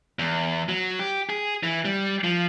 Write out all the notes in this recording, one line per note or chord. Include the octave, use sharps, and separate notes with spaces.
E2
F#3
G4
G#4
E3
G3
F3